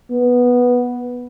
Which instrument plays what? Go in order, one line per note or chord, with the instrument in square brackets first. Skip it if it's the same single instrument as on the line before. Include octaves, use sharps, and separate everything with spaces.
[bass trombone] B3